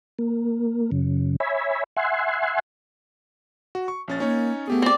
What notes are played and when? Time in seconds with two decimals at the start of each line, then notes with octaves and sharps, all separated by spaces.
0.19 A#3
0.92 F#2 C#3
1.40 C#5 E5 G#5 B5
1.97 E5 F#5 G#5 C6
3.75 F#4
3.88 C#6
4.08 A#1 C#4 A6
4.20 A#3 C#4 D#4 C#5
4.67 A3 B3 G4 G#4
4.82 C4 D5